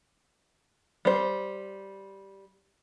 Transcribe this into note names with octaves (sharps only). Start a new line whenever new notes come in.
G3 C5